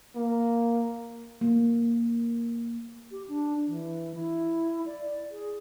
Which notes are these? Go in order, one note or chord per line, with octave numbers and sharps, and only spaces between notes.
A#3
A#3
G4
D4
E3
E4
D5
G#4